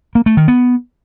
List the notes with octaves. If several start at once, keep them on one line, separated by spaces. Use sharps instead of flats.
A#3
A3
D#3
B3